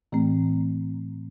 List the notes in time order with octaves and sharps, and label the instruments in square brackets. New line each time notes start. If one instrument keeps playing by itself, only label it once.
[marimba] A2 E3 A3 C4